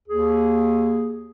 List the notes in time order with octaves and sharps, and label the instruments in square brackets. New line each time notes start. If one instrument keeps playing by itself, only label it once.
[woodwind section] D#2 G#4